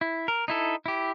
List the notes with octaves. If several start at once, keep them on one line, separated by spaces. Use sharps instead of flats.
E4
A#4
D#4 E4 A4
E4 G4